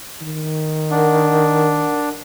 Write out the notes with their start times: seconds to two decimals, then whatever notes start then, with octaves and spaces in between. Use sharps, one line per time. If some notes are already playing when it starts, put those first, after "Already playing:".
0.22 D#3
0.91 D4 A#4 F#5